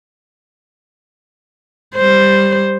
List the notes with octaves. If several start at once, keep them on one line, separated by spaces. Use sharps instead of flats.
G3 C5